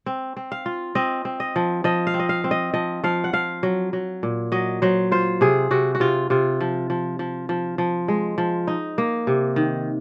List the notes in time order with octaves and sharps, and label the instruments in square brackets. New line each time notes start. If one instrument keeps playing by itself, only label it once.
[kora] C4
C4
F5
F4
C4 D#5
C4
D#5
F3
F3 D#5
F5
C4
D#5
F5
C4
D#5
F3 D#5
F3 F5
F#5
F3 F5
F#3
F#3
A#2
F#3 D#5
F#3 C5
F4 C5
C3 G#4
C3 F#4
F#4
C3 F4
C3 F4
F3
F3
F3
F3
F3
G#3
F3
D#4
A#3
C3
D#3